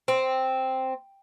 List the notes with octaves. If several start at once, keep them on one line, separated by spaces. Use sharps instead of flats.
C4